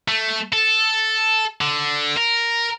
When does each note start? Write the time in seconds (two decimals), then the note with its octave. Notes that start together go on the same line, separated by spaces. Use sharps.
0.08 A3
0.53 A4
1.61 D3
2.17 A#4